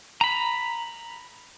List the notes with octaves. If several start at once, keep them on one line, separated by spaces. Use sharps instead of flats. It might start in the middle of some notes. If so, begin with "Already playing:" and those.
A#5 B5